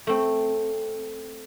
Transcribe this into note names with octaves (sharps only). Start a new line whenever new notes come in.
A3 C4